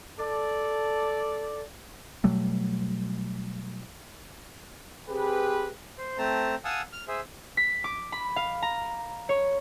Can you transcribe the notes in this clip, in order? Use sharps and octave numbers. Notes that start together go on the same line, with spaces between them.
A4 D5
B2 F#3 G3 A3
C4 G4 G#4 B4
C5
A3 C4 A5 A#5
F5 F#5 G#5 A5 D#6 E6
F6
G#4 C5 E5
B6
D6
B5
F5
A#5
C#5